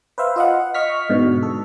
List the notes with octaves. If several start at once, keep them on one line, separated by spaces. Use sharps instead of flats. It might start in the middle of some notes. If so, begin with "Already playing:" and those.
B4 C5 E5 F5
F4 D#5 F5 F#5
D#5 C#6 F6 B6
G#2 B2 D3
A4